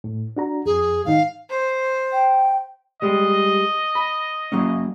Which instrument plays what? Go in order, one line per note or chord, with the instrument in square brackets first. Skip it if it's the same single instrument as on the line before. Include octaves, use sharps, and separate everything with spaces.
[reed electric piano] A2
D4 F#4 A#5
[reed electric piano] F2 [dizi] G#4
[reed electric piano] G#2 D#3 D#4 [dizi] F5
[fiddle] C5
[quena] G5
[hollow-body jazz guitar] G3 G#3 [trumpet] D#5
[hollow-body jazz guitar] B5
F#3 A#3 C#4